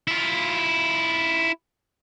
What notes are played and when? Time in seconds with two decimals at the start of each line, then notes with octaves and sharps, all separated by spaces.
0.08 E4 F4